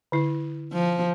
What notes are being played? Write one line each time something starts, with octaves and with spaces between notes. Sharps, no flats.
D3 E4
F3